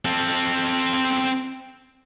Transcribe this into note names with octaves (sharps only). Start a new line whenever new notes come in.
C4 A4